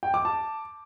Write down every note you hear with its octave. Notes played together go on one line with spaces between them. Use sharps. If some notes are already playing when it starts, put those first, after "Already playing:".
G5
D6
A5